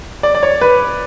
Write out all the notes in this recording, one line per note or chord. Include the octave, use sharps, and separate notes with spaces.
D5
D5
C#5
B4